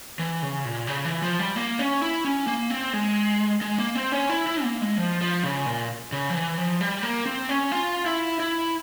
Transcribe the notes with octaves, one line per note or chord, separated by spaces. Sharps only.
E3
C#3
A#2
C#3
E3
F3
G3
A#3
C#4
E4
C#4
A#3
C4
G#3
G#3
A#3
C4
C#4
E4
E4
A#3
G#3
F3
F3
C#3
A#2
C#3
F3
E3
F3
G3
A#3
C4
C#4
F4
E4
E4